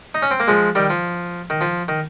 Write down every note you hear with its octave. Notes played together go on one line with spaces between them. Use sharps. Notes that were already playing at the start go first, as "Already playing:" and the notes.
D#4
C#4
C4
A#3
F3 G#3
D#3 G3
F3
D#3
F3
D#3